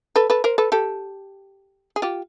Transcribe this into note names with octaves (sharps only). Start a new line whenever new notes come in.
A4 B4
A4 B4
A#4 C5
A4 B4
G4 A4
G#4
F4 G4